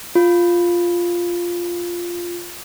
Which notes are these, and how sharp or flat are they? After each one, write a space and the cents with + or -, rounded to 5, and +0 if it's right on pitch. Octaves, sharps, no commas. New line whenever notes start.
F4 +0